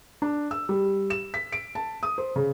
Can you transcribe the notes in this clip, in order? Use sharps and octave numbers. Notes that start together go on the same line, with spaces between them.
D4
E6
G3
E7
B6
D7
A5
D#6
C5
C#3